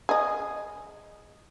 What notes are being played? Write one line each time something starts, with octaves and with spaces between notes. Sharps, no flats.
G#4 D#5